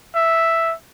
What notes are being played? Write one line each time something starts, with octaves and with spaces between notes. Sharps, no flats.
E5